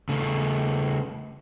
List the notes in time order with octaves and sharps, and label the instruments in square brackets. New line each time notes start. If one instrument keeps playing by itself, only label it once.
[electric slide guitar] C#3 A3